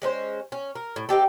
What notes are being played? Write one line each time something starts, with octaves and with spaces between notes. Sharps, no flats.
G#3 C#4 D4 C5
C#4
A#4
A2
C4 D#4 G4 A4